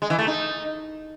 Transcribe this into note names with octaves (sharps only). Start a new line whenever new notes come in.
G#3
E3
A3
D#4